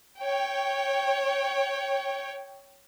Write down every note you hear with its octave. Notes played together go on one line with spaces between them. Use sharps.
C#5 G5